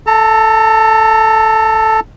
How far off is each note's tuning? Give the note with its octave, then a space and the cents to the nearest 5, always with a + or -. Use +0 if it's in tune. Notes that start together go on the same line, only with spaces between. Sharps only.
A4 +0 A#5 -40